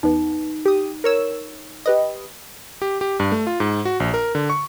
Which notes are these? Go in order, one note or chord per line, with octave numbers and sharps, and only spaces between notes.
E2 B3 D#4
G4 D#6
A#4 C#5 E6
G4 B4 D#5
G4
G4
G2
A3
F4
G#2
F#4
A#1
A#4
D3
C#6